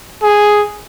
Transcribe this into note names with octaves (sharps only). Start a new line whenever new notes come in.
G#4